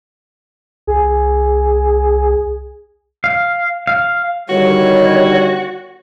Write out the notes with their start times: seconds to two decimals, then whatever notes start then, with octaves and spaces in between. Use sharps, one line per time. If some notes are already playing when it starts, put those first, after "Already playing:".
0.87 C2 G#4
3.24 F5
3.87 F5
4.49 G1 D#3 G3 F#4 C#5